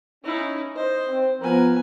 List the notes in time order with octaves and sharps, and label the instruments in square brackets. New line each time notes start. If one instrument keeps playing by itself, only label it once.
[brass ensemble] C#4 [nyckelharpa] D#4 E4
[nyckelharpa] C5 [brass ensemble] D#5
[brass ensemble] C4
[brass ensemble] F3 A#4 [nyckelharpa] B3 G#5